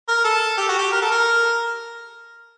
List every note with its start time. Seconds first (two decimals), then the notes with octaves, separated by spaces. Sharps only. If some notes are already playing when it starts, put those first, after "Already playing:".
0.08 A#4
0.24 A4
0.57 G4
0.69 F#4
0.79 G4
0.92 A#4
1.01 A4
1.11 A#4